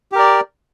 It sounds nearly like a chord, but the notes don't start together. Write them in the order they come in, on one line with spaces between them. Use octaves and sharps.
G4 A#4 D5